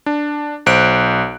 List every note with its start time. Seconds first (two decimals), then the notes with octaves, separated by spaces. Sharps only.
0.06 D4
0.66 B1 C5 F#6 D7